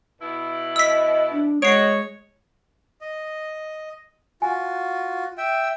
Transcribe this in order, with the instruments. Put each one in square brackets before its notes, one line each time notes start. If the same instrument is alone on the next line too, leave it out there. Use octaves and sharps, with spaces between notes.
[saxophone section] B2 E4
[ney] D#5 [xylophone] E6 B6
[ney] D4
[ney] G#3 [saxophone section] F#4 D#5 [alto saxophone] C#5 [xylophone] C7 D7
[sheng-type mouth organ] D#5
[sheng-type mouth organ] F4 F#4 [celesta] G#5
[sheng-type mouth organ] E5 G5